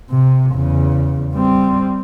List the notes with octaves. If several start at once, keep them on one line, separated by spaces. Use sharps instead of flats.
C3
E2 C#3
G3 C4